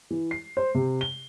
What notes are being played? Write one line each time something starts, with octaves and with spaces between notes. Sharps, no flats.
E3
C7
C5
C3
G7